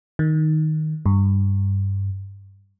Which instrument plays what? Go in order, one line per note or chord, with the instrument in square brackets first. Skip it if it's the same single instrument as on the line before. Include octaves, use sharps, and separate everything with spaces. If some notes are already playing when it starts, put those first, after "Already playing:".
[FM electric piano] D#3
G2